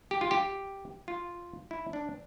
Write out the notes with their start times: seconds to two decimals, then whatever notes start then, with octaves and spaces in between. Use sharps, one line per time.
0.11 G4
0.21 F4
0.31 G4
1.08 F4
1.71 E4
1.93 D4